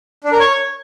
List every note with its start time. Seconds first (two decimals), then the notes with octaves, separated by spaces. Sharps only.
0.24 D4
0.32 A#4
0.40 C#5